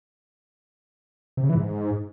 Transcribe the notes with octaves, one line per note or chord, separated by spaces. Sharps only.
C3
C#3
E3
G#2